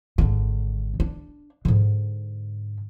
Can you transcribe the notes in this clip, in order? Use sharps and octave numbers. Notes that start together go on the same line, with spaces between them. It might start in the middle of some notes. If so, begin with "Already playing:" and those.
G#1 D3
D4
G#2 D3